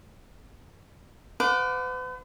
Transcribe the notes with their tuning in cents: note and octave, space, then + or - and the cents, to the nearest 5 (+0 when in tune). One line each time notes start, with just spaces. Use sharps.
B4 +45 F#5 -30 D6 +0